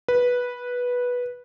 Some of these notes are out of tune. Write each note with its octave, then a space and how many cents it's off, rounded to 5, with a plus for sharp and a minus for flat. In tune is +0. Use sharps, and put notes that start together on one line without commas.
B4 -10